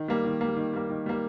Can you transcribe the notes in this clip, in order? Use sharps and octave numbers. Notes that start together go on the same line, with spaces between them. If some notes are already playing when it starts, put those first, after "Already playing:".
Already playing: D#3
G3 A#3
D#3
G3 A#3
D#3
G3 A#3
D#3
G3 A#3